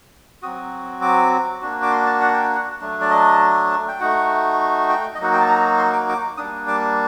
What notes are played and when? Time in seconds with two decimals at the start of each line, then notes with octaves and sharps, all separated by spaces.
0.42 F#3 C4 F#4 D#6
1.02 D6
1.61 A#3 D4 F#4
1.82 D6
1.91 C6
2.06 A5
2.21 F#5
2.33 G5
2.44 F#5
2.80 F#3 A3 D4
3.01 D5
3.10 D#5
3.88 G5
4.00 A3 D#4 F#4 F#5
4.89 G5
5.15 D#5
5.19 F#3 A#3 D#4 F#4 F#5
5.32 G5
5.40 A5
5.48 A#5
5.78 C6
5.93 D6
6.09 D6
6.37 G3 A#3 D4 D#6
6.67 D6